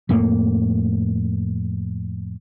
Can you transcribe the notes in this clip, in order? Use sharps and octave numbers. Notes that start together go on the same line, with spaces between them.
F2 A2 A3 A#3